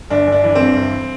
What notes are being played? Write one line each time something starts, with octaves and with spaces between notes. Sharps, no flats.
G1 D4
G1
D4
E3
G2 C4
G1